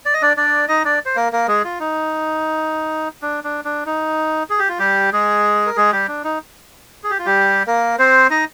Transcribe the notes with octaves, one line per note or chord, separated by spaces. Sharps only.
D5
D#5
D4 D5
D4 D5
D#4 D#5
D4 D5
C5
A#3 A#4
A#3 A#4
G#3 G#4
F4
D#4
D4
D4
D4
D#4
G#4
G4
F4
G3 G4
G#3 G#4
A#4
G#3 G#4
G3 G4
D4
D#4
G#4
G4
F4
G3 G4
A#3 A#4
C4 C5
D#4 D#5